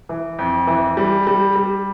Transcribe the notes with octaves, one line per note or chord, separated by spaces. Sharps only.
E3
F2
E3
G3
G3
G3